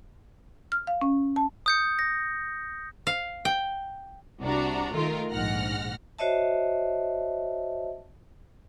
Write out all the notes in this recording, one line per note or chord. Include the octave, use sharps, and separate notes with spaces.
F6
F5
C#4
A5
D#6 G6 C#7
A#6
F5
G5
C2 D4 F#4 A#5
D#3 A3 F4 A#4
A#1 G#2 F#5 F6 A#6
F#4 C5 C#5 D#5 E5 A5